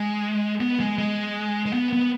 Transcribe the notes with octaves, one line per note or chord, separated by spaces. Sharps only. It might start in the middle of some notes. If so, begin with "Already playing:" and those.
Already playing: G#3
B3
G#3
G#3
G#3
B3
B3